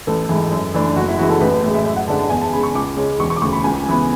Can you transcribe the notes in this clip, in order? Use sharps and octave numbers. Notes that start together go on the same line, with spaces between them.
A1 A4
G#2 E3
F#2
E3 A3 D4
F#1 F#4
E4
F#2 E3 G#3 F#4
A4
A1 B4
A2
G#3
E5
F#2 E5
F#5
D3 G#3 D4 A5
A5
E2 G#5
A5
C#3 G#3 B5
C#6
C#2 D6
C#3 G#3 C#4
E1 C#6
C#6
D6
D2 C#3 C#6
B5
C#2 G#5
C#3 E3 B3